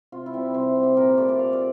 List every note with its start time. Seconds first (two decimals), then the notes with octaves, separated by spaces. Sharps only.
0.12 C3 F4
0.26 E4
0.33 G3 C4
0.54 C3 C5
0.76 G3 C4
0.83 G4
0.97 A#2 A#4
1.18 F3 A3 D5
1.29 D5
1.38 A#2 F5
1.53 D5